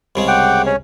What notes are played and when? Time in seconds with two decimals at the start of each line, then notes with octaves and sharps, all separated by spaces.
0.16 C2 C#3 G#3
0.28 F#5 G5 D6
0.66 C#4 C#5